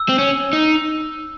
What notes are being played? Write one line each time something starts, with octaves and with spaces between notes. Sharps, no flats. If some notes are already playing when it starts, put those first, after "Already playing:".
Already playing: E6
C4
C#4
D#4